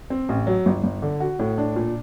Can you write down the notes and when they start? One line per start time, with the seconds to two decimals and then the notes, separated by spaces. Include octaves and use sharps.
0.10 C4
0.29 A1
0.47 F#3
0.66 G1
0.84 G1
1.02 D3
1.20 F#4
1.39 A2
1.58 D4
1.76 A#2